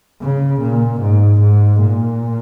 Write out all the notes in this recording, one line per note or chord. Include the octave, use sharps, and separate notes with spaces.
C#3
A#2
G#2
G#2
A#2